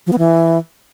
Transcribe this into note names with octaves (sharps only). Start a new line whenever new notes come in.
F3
B3
E3